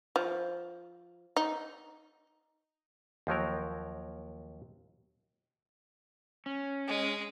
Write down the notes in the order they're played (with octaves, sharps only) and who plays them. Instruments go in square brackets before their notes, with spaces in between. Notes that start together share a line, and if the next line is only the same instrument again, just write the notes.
[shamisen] F3
D#4
[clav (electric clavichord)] D#2 F3 F#3 A#4
[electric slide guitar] C#4
[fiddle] G#3